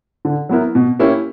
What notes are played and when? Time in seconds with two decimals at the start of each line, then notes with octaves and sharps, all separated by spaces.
0.25 D3
0.49 F#3 B3 E4 A#4
0.75 B2
1.00 A#3 C#4 E4 G4